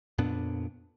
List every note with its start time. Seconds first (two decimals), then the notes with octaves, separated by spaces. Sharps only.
0.18 F2 A#2 B3 D4